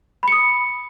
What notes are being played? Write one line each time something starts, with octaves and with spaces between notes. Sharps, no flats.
B5 D#6 C#7